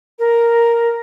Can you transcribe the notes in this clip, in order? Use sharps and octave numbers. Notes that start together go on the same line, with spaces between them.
A#4